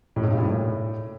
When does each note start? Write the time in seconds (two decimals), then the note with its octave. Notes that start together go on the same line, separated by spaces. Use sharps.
0.16 A2
0.23 G#2
0.31 G2
0.38 A#2
0.45 A2